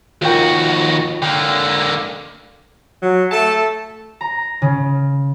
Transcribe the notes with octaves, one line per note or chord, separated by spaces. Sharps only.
D#2 F4 F#4 A#4 G5
D3 A#3 G5
F#3
A3 A4 A5
A#5
C#3